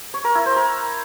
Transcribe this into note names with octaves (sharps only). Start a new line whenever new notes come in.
C#5
A#4
E4
C5
A#4